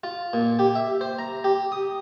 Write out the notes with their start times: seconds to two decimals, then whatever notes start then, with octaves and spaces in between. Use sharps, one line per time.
0.04 F4
0.33 A#2
0.59 G4
0.75 E5
1.01 C5
1.19 A#5
1.44 G4
1.72 D#6